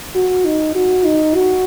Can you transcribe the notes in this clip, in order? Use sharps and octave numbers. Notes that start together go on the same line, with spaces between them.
F#4
D#4
F#4
D#4
F#4